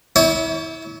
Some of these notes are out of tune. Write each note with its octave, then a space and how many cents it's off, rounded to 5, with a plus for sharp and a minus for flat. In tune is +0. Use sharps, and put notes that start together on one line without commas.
E4 -30 C#5 +30